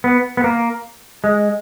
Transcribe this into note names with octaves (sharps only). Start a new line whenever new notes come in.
B3
B3
A#3
G#3